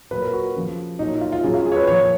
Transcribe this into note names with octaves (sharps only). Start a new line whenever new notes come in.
A#2 F#3 B4
A#4
F#4
C#3 F3
A#2 F#3 D#4
F4
F4
C#3 F#3 G#4
F4
G#4
C#5
B4
A#2 F3 C#5